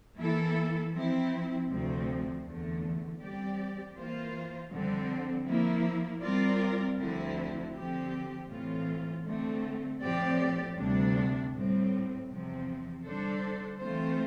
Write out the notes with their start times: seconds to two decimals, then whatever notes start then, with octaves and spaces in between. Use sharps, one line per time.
0.17 E3 A#3 E4 A4
0.93 F3 C4 E4
1.68 D2 C3 F3 C4
2.44 E2 D3 A3
3.20 G3 C4 G4 D5
3.95 E3 A#3 F4 C5
4.71 F2 D3 G3 C4
5.47 F3 A#3 E4
6.22 G3 C4 F4 A#4 D5
6.98 D2 D3 F3 C4 E4
7.74 D3 F3 C4 G4
8.49 A2 E3 A3 C4 F4
9.25 D3 A3 C4
10.01 A2 F3 C4 G4 D5
10.76 D2 C3 G3 D4
11.52 A2 G3 C4
12.28 E2 C3 F3 C4
13.04 D3 G3 D4 A4 C5
13.79 E3 A3 C4 F4 C5